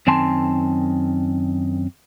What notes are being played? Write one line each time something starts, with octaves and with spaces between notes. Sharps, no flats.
F#2 D#3 C4 G#5 A5 C6